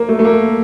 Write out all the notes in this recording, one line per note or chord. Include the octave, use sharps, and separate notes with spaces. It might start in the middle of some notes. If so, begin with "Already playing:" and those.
Already playing: A#3
A3
A3
A#3